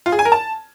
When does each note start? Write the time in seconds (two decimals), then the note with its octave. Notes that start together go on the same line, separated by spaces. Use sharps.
0.06 F4
0.12 G#4
0.19 G#5
0.25 A#4
0.32 A5